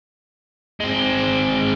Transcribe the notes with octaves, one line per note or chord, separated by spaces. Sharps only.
G#3 C4